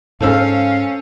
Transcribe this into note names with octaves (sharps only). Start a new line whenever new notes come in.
G#2 G#3 C#4 A4 C5 F5 E6